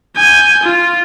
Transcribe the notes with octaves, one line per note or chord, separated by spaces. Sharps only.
G#5 G6
F4